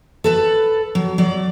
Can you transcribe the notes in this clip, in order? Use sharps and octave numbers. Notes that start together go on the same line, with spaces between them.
A4 B4 A5
F#3
F#3 D5